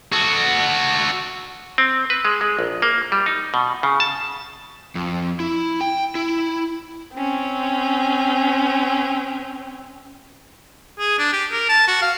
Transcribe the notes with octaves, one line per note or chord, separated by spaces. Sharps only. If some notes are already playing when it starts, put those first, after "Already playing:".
F#4 A4
C4
B4
G#3
G#3
A#1
A#3
G3
D#4
B2
C#3
A5
F2
E4
G5
E4
C4 C#4
G#4
D4
G4
A#4
A5
F#4
F5